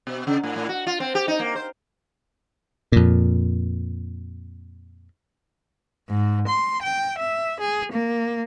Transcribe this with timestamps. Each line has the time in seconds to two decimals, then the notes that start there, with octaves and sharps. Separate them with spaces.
0.07 B2
0.27 C#3
0.43 A2
0.56 A2
0.69 F#4
0.87 F4
1.00 C4
1.15 G4
1.28 D#4
1.40 A#3
1.55 C5
2.92 F2 A#2
6.09 G#2
6.47 C6
6.81 G5
7.18 E5
7.60 G#4
7.92 A#3